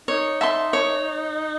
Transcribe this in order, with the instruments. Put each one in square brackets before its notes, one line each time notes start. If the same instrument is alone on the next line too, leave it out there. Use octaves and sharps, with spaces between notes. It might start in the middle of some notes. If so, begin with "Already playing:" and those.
[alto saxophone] D#4 [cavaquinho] C#5
[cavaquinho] E5 A5 C6
C#5